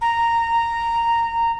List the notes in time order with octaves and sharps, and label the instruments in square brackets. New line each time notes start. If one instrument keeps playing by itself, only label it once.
[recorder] A#5